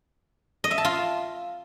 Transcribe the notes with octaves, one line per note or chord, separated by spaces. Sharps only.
D#5
E5
A5
F4